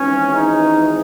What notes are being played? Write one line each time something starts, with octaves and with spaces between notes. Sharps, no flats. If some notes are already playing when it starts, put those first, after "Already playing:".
Already playing: G#1 G#2 E3 C#4
D#4